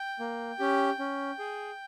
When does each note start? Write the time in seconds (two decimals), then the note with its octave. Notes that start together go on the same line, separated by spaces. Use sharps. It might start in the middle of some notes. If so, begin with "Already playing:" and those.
Already playing: G5
0.20 A#3
0.59 C#4 G4
0.99 C#4
1.39 G#4